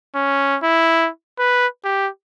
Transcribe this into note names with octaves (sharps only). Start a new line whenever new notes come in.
C#4
E4
B4
G4